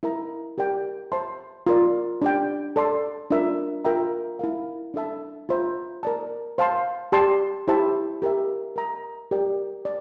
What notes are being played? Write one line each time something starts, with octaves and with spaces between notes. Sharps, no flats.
E4 A#4 E5 A#5
G4 A#4 D5 G5
C5 E5 A5 C6
F4 A#4 D5
D4 G4 D5 G5
A4 D5 A5 C6
D4 F4 A#4 E5
F4 A#4 E5 G5 A#5
E4 A#4 F5
D4 A4 E5 A5
F4 C5 E5 A#5
A#4 D5 A5
C5 F5 A5 C6
G4 D5 A5 C6
E4 G4 C5 E5 A5
G4 A#4 E5
A#4 E5 A#5
G4 A#4 D5 G5
D5